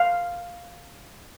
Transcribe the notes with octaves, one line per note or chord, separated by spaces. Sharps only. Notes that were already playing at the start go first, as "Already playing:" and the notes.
Already playing: F5